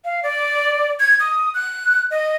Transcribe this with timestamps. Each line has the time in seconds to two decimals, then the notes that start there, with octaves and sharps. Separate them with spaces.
0.05 F5
0.23 D5
1.00 G#6
1.20 D#6
1.54 F#6
2.11 D#5